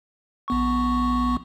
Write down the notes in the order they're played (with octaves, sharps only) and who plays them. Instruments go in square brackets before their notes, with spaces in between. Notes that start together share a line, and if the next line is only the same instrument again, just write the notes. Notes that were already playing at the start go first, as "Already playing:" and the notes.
[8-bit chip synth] A#1 B3 C#6